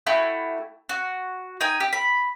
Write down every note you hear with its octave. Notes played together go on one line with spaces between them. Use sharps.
A3 E4 F#4 G4
F#4
D#4 G5 G#5
G4
B5